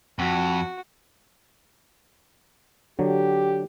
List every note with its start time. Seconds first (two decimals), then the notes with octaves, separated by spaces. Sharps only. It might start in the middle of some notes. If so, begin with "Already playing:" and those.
0.19 F2 F#4
2.99 D3 F#3 G4